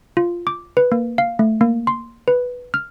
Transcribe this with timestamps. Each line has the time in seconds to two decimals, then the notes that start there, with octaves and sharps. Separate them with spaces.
0.17 F4
0.47 D6
0.77 B4
0.92 A#3
1.18 F5
1.39 A3
1.61 A#3
1.87 C6
2.28 B4
2.74 F6